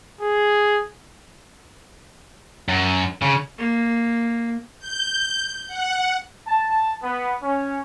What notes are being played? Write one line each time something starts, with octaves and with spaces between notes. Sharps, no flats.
G#4
F#2
C#3
A#3
G6
F#5
A5
B3
C#4